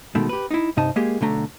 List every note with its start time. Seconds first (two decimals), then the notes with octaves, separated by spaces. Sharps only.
0.15 B2 D#3 G#3 A3
0.29 G4 B4
0.51 D#4 E4
0.77 G2 C3 D#4 D#5 A5
0.96 G#3 A#3 G4 G#4
1.21 B1 D3 A3 A#5